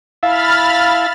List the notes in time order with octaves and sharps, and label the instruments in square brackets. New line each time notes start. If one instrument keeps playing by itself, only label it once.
[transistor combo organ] E4 E5 A5 [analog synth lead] F5 [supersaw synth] B5 F6 A6